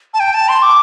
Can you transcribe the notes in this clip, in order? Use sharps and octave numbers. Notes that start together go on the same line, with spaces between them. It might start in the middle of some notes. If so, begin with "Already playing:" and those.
A5
G5
A5
C6
D6